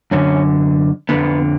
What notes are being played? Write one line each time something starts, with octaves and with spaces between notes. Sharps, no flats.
F#2 D3 C#4
F2 D3 B3